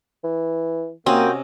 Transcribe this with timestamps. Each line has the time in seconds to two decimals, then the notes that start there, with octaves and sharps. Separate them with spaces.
0.24 E3
1.06 C3 A#3 C4 C#4 F#4 D#5